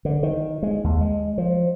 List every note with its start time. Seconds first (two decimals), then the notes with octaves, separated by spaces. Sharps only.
0.05 D3
0.23 D#3
0.63 G#3
0.84 D#2
1.01 G#3
1.38 F3